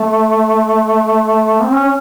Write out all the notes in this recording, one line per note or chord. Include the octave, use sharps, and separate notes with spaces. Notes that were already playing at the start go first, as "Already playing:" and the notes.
Already playing: A3
C4
C#4
C#4